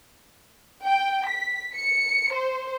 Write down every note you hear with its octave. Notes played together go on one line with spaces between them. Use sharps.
G5
B6
C#7
C5